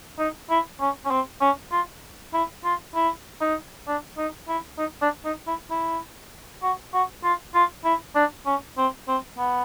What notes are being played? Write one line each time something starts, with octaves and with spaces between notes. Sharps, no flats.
D#4
E4
C#4
C#4
C4
C#4
F4
E4
F4
E4
D#4
D4
D#4
E4
D#4
D4
D#4
E4
E4
F#4
F#4
F4
F4
E4
D4
C#4
C4
C4
B3